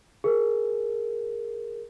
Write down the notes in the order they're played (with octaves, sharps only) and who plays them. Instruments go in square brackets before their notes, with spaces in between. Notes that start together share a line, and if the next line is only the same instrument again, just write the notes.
[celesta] G#4 A#4